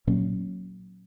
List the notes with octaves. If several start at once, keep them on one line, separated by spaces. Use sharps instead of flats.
A#2 F#3 A#3 C#4